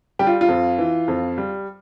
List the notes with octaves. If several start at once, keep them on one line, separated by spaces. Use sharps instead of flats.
G3 G4
F4
F4
F2
E3
F2
G3